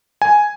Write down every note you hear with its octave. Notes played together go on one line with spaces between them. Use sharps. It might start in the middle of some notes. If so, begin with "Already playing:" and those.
G#5